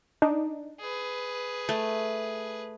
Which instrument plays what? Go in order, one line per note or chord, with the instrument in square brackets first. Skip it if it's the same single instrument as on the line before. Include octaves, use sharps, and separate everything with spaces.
[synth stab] D4 D#4
[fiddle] G#4 B4
[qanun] A3